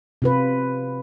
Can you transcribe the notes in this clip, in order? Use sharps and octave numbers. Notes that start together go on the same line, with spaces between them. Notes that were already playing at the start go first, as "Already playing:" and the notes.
C3 F4 B4